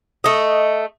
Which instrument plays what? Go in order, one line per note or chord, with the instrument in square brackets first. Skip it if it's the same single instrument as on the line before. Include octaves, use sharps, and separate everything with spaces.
[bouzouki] A3 D#5